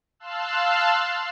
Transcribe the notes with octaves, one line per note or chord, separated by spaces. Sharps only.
F5 A5 C6 E6 F#6